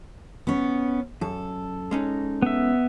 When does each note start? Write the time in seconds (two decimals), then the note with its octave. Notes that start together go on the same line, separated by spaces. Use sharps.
0.47 B3 C#4
1.21 F#2 A4
1.91 G#3 C#4 D#4
2.42 B3 E5